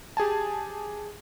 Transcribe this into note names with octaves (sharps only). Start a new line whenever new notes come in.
G4 G#4 G#5 A5